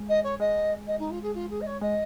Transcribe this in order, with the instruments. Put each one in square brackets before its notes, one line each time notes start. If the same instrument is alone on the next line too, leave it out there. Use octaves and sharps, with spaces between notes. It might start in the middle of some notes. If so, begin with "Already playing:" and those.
Already playing: [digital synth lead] G#3
[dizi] D#5
C#5
[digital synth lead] G#3 [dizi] D#5
[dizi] D#5
D#4
F4
G#4
F4
G#4
D#5
C#5
[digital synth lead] G#3 [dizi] D#5